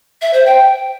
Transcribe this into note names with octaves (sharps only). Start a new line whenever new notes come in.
E5
C5
G5